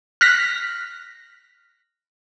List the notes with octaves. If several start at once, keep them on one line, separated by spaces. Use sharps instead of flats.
F6 F#6 A#6 B6